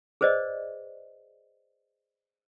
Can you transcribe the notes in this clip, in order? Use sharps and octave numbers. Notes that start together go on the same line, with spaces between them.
G#4 B4 C5 D5 D#5